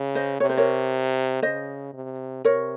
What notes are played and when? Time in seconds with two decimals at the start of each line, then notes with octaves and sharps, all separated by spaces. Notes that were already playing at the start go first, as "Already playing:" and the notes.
Already playing: C#3
0.15 C5 D#5
0.40 C3 C#5
0.49 C5
0.57 A#4 C#5
1.42 C#3 C5 D#5
1.93 C3
2.45 C3 A#4 C#5